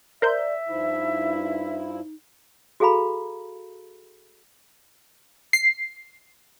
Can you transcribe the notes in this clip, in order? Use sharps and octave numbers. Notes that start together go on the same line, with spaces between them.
A#4 C5 D5 E5 G6
G2 F3 D#4 E4
F#4 G#4 A4 F5 A#5 B5
C7